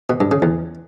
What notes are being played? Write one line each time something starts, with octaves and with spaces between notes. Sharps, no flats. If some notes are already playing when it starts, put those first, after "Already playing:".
B2
G2
C#3
E2